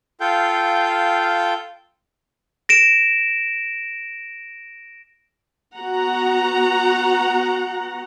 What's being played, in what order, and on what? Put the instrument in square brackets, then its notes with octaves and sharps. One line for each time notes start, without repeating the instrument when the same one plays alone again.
[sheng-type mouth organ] F4 A4 F5 G5 G6
[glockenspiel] A#6 D7 E7
[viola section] B3 F#4 F#5 A#5